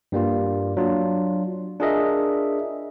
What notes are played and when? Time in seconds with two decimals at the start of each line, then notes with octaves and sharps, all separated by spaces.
0.12 G2 G3 A#3 F4
0.77 F#3 D4 F4
1.80 D4 F4 G#4 A#4 D#5 E5